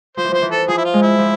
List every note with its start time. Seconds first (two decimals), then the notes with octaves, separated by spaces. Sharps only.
0.17 F3 C5
0.24 E3
0.32 F3 C5
0.42 E3
0.51 A4
0.68 F3 G#4
0.77 E4
0.85 F4
0.94 G#3
1.02 E4
1.19 F3